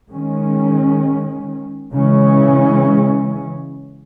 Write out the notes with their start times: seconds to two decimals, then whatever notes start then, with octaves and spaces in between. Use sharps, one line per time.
0.10 D#3 G#3 C#4
1.94 C#3 E3 G#3 C#4